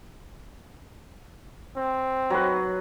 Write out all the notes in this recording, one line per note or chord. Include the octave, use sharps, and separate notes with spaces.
C4
F#3 B4